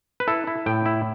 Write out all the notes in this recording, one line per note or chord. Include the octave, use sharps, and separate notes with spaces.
B4
E4 A4
E4
A2 G5
E4